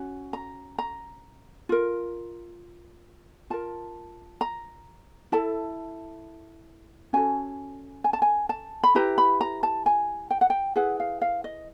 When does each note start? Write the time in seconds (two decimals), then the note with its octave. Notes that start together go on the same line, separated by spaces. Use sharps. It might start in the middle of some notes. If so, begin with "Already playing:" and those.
Already playing: C#4 F#4
0.33 A#5
0.78 A#5
1.69 F4 A#4
3.50 F4 A#4 A5
4.41 A#5
5.32 E4 A4 A5
7.13 C#4 F#4 A4 G#5
8.04 G#5
8.13 A5
8.22 G#5
8.49 A5
8.84 B5
8.95 E4 G4 B4 A#5
9.18 B5
9.41 A#5
9.63 A5
9.86 G#5
10.31 G5
10.41 F#5
10.50 G5
10.76 E4 G#4 B4 F#5
11.00 F5
11.22 F5
11.44 D#5